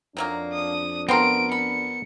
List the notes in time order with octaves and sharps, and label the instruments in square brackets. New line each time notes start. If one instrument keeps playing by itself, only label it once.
[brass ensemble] F2 D4 [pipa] D#3 F#3 A#3
[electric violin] D#6
[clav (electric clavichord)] B3 A#4 [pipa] C4 F4 C6 [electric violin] D7
[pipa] B5 [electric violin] C#7